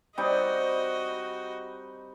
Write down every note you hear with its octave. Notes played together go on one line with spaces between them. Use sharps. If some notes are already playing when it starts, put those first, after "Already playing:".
G3 C4 D#4 F#4 D#5